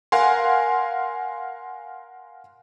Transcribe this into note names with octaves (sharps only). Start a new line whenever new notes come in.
A#4 F5 F#5 G#5 C6